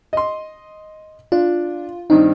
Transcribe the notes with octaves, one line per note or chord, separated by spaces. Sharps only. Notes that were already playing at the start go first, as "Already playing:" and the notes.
D#5 C6
D4 F4
G2 D#3 C4 D#4